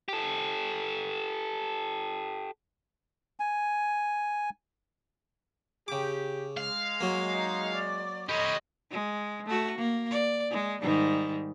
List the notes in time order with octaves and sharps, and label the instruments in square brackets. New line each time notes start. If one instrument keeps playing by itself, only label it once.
[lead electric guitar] G4 A4
[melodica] G#5
[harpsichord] C#3 D6 [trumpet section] G4
[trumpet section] G#3 [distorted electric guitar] F5
[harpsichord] F#3 A#3
[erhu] D#4
D5
[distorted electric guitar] G4 C#5 [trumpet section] A4 B5 C6 [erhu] D#5
[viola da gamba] G#3
A3 F#4
A#3
D5
G#3
G#2 D#3 G3